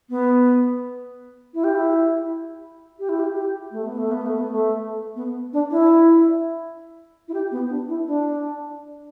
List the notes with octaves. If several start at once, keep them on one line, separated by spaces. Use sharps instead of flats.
B3
E4
G4
E4
G4
E4
G4
G4
A3
B3
A3
B3
A3
B3
A3
B3
D4
E4
E4
G4
B3
D4
E4
D4